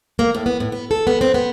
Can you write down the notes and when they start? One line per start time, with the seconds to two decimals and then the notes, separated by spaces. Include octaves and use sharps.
0.19 A#3
0.35 A2
0.46 B3
0.60 A2
0.72 B3
0.91 A4
1.07 B3
1.21 C4
1.34 B3